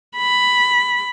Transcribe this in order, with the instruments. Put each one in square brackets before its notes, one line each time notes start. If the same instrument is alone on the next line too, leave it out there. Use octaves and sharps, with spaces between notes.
[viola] B5